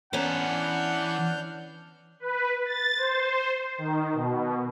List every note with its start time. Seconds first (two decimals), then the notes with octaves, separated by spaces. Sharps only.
0.13 E3 B3 C#4 D4 F#5 A#5 F6 G6
2.20 B4
2.66 A6
2.98 C5
3.78 D#3
4.14 B2